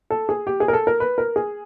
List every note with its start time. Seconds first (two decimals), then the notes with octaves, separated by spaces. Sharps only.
0.10 A4
0.29 G#4
0.47 G4
0.60 G#4
0.68 A#4
0.73 A4
0.87 A#4
1.00 B4
1.18 A#4
1.36 G#4